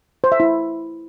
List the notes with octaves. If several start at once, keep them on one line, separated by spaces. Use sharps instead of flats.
C5
E5
E4